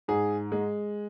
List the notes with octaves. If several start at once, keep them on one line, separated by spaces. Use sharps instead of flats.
G#2 G#4
G#3